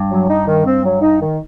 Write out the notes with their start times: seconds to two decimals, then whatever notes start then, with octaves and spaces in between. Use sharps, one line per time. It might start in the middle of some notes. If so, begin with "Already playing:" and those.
Already playing: G2
0.11 F#3
0.29 D#4
0.47 D#3
0.65 C4
0.84 F#3
1.01 D#4
1.21 D#3